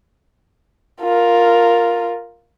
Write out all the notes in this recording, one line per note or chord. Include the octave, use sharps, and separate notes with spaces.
F4 A#4